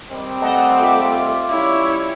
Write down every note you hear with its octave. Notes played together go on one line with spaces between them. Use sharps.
D#3 G3 C4
A3 D#5 F#5 A5
F4 E5 D6
G3 C#4 E4 C#5